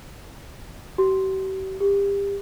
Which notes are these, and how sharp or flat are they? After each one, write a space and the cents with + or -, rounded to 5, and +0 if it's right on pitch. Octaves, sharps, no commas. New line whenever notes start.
G4 -45
G4 +30